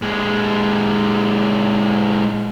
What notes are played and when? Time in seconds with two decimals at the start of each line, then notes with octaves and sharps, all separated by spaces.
0.02 A#2 G#3